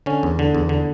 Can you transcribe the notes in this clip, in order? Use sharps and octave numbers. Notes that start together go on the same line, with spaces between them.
D3 C#4
E2
D3
E2
D3